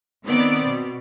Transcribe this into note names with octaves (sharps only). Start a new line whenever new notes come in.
D#3 B3 C4 D5
B2